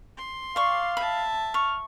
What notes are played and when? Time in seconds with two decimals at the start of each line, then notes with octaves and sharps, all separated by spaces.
0.17 C6
0.56 D5 F5 C#6
0.97 E5 A5 B5
1.54 C#6 F6